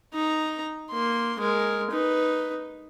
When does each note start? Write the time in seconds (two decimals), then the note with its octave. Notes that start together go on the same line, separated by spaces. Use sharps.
0.13 D#4 A#5
0.91 A#3 C6
1.39 G#3 A#4
1.91 D#4 B4